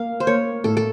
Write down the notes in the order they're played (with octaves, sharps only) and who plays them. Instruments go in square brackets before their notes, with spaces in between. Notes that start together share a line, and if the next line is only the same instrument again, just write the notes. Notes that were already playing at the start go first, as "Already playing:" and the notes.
Already playing: [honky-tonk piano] A#3 [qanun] F5
[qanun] C5
[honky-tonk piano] A#3 [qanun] C#5
[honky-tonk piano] A2 [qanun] A4
[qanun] A4